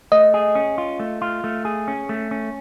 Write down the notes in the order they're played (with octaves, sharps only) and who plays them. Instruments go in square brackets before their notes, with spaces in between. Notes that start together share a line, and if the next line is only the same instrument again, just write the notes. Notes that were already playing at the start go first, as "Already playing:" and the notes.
[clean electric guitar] A3 [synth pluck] D#5
[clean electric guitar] G#4
C#4
F4
A3
F4
A3
G#4
C#4
A3
C#4